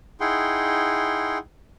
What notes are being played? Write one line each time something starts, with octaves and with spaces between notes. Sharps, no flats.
D#4 E4 G#4 F#5 G5 C6